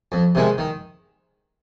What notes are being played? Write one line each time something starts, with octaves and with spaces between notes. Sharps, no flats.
F2
C3 D#3 G#3
D#3